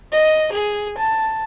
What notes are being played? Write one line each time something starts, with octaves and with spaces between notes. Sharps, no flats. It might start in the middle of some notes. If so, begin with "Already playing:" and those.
D#5
G#4
A5